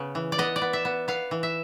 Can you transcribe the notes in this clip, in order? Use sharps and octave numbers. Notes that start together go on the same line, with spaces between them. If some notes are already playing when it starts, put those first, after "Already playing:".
Already playing: C#3 B3
E3
D5
B3 D#5
D5
B3
E5
B3
B3 F5
E3
E5